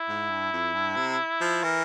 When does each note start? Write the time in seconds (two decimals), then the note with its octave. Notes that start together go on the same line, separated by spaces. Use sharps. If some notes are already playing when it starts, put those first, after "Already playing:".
Already playing: E4
0.09 G#2
0.31 G2
0.52 F2
0.74 G2
0.97 C3
1.41 F3
1.63 E3 A#4